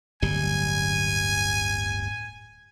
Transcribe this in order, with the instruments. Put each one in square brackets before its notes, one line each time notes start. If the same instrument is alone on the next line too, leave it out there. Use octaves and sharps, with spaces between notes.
[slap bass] D1 G1 G3 [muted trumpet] G#5